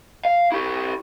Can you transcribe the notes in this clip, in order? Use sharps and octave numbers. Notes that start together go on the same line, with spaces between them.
F5
E4 G4